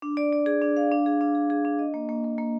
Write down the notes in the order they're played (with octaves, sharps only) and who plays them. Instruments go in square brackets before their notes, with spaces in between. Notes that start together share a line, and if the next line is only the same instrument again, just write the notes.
[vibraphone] D4
D5
D5
G#4
D4
F5
D4
G#4
D4
G#4
G#4
D4
D#5
A#3
A#3
A#3
A#3